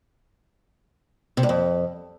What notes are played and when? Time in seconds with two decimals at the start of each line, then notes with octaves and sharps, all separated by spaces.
1.37 C3
1.43 G2
1.49 F2